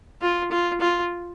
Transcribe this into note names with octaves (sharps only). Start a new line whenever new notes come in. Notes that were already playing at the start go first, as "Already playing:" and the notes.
F4
F4
F4